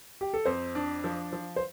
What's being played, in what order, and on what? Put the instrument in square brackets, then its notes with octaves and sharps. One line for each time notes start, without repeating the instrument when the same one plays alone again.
[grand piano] G4
A4
[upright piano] F2 [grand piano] C5
[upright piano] D4
F3
F3
[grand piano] C5